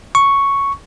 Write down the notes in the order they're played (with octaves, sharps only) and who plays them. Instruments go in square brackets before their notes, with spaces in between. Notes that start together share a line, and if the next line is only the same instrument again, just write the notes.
[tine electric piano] C#6